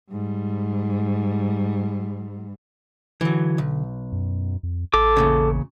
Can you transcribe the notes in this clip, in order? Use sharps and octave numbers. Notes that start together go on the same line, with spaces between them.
G#2 G3
D3 E3 F#3
B1
F#2
F2
A1 A4 D6
E2 A#2 C#3